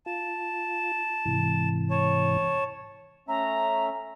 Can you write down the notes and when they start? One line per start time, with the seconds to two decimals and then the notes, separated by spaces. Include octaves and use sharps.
0.06 F4 A5
1.25 G#2 C3 E3
1.90 C#5 A5
3.28 A3 C#4 E5 A#5